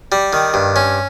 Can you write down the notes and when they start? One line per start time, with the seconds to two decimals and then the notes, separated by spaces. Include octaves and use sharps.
0.12 G3
0.33 D#3
0.54 G2
0.76 C#4